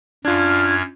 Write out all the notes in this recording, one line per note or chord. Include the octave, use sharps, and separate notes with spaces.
F#2 D4 F4 F6 G#6